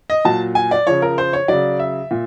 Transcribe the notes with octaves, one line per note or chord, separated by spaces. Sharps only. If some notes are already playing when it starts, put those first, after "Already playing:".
D#5
A#2 F#3 A5
G#5
D5
C#3 F3 C#5
A#4
C5
C#5
C#3 F#3 D5
E5
A#2